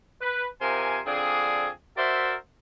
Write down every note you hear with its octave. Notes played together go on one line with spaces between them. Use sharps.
B4
C3 F3 A#4 C5 G#5
D3 F3 C4 D4 G#4
F#4 A#4 C5 D5 E5